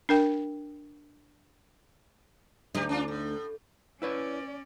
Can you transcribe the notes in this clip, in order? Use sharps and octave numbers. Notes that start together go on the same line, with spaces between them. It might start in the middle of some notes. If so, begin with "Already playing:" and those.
D4 A#4 G5
D2 F#3 D#4 G4
C#4 D4 F4
A2
C#4 E4 B4 C#5 D5